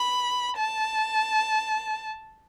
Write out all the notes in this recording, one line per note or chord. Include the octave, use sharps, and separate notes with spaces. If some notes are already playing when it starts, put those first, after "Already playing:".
Already playing: B5
A5